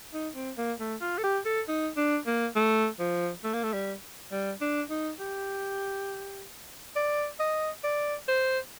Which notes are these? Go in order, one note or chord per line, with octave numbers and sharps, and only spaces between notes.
D#4
C4
A#3
A3
F4
A4
G4
A4
D#4
D4
A#3
A3
F3
A3
A#3
A3
G3
G3
D4
D#4
G4
D5
D#5
D5
C5